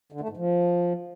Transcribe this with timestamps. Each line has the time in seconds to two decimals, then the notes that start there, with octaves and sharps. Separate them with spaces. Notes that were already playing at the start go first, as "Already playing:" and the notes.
0.12 D3
0.21 A3
0.29 G#2
0.37 F3